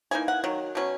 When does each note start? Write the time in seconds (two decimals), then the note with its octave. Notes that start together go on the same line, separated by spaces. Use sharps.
0.11 E3 A#3 D#4 G#5
0.28 F#5
0.44 D#3 F#3
0.75 B2 F#3 C#4